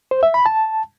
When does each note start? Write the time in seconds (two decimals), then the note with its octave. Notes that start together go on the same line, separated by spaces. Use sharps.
0.11 C5
0.23 E5
0.34 B5
0.46 A5